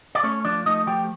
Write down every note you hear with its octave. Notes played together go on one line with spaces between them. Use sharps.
D5
A3 C#4 C#5
F3 D4 D5
A3 D#4 D#5
F3 G4 G5